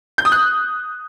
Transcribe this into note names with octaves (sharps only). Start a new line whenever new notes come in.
G6
D#6
F#6